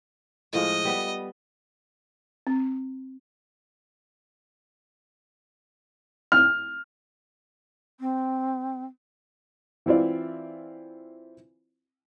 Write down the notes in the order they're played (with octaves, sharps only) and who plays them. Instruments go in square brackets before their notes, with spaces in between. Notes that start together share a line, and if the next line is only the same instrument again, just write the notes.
[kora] A2 F3 G#3 [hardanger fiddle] D#5
[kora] G3 B3
[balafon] C4
[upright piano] F6
[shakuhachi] C4
[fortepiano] E3 C4 E4 F4 D5